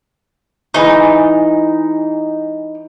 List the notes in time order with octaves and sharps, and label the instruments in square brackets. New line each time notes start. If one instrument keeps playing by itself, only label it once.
[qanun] E3 G#3 [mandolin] D#4